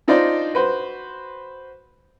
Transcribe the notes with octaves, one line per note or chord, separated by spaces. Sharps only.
D4 D#4 F4 C5 D5
F#4 B4 C5